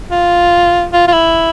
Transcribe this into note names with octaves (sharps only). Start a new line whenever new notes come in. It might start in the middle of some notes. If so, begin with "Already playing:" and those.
F4
F4
F4
E4